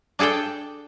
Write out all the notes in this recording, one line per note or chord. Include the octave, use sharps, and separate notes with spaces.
D4 G#4 A4 D5 G5